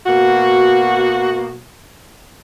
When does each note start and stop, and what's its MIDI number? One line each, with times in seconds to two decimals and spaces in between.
0.06 1.58 47
0.06 1.58 58
0.06 1.58 66